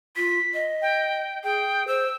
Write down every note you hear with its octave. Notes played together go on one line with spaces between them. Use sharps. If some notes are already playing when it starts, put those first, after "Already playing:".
F4 B6
D#5
G5
G#4 G5
C5 E6